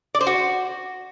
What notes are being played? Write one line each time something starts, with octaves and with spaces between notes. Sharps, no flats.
D5
C5
F#4